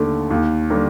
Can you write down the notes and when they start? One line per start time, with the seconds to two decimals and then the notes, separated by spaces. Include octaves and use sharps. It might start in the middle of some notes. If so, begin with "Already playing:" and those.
Already playing: D#2 D3 A3
0.30 D#2
0.70 D3 G3 A#3